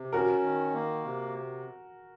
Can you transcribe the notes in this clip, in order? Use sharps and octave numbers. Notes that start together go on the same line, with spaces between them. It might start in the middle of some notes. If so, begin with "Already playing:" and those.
Already playing: C3
C#4 F#4 A#4
D#3
A#3
C3